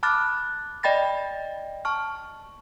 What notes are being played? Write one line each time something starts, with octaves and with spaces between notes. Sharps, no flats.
A5 B5 D6 F6 F#6 A6
D5 D#5 G5 B5 A6 A#6
A5 C#6 F6